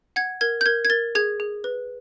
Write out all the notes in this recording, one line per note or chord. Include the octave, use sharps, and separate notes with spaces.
F#5 G#6
A#4 G#6
G6
A#4 G#6
G#6
A#4 A6
G#4 G#6
G#4
B4